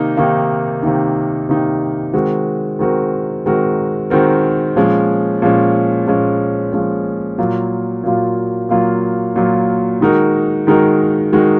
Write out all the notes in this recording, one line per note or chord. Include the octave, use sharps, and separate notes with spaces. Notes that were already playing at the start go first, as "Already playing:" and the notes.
Already playing: C3 D#3 A#3 D#4
C3 D#3 A#3 D#4
C3 D#3 A#3 D#4
C3 D#3 A#3 D#4
D#3 G#3 C4 F#4 A#4
D#3 G#3 C4 F#4 A#4
D#3 G#3 C4 F#4 A#4
D#3 G#3 C4 F#4 A#4
A#2 F3 G#3 C#4
A#2 F3 G#3 C#4
A#2 F3 G#3 C#4
A#2 F3 G#3 C#4
A#2 F#3 A#3 F4
A#2 F#3 A#3 F4
A#2 F#3 A#3 F4
A#2 F#3 A#3 F4
D#3 G#3 D#4 F#4 A#4
D#3 G#3 D#4 F#4 A#4
D#3 G#3 D#4 F#4 A#4